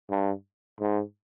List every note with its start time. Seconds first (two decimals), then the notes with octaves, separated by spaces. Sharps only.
0.10 G2
0.80 G#2